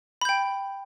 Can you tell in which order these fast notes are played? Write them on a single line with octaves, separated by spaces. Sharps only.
B5 G6 G5